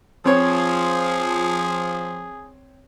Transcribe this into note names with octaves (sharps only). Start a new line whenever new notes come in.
F3 C4 G#4 C#5